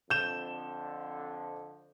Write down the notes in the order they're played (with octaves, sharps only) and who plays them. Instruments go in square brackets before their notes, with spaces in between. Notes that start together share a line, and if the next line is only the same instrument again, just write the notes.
[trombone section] F2 D3 [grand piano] G6 E7